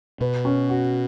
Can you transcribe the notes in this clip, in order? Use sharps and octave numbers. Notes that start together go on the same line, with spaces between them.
B2 B4
C#4
F#4